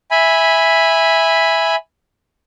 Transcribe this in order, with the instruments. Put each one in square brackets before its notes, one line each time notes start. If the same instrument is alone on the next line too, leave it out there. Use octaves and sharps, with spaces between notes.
[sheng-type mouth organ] E5 G#5 B5